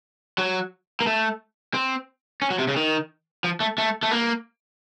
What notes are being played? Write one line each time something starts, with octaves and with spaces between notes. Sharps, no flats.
F#3
A#3
A3
C4
C#4
F#3
C3
C#3
D#3
F3
A3
A3
A3
A#3